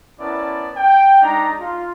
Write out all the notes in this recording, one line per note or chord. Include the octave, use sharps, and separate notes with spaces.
B3 C#4 E4 A#4 D5 A5
G5
G#3 D4 D#4 A#5
F4